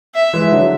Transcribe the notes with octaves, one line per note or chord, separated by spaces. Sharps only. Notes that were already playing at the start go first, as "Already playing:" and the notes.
E5
E3 G#3
D3 F#3